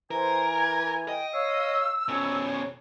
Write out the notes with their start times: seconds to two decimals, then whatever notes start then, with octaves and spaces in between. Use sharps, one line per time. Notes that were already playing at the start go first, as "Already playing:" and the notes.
0.11 E3 A#4 C5 G#5
0.58 G#6
1.08 D#5 G5
1.33 C#5 F5 E6
2.08 F2 B2 C#4 C#5